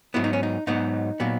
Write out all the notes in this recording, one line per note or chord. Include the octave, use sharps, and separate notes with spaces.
G#2 F#3 B3 E4
D#4
C#4
D#4
G#2 F#3 B3 D#4
A#2 F#3 B3